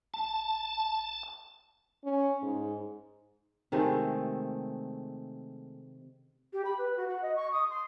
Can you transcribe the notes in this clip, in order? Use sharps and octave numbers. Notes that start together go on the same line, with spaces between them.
A5
C#4
G#2
C3 D#3 G#3 A3
G4
B5
B4
F#4
F#5
D#5
C#6
D#6
C6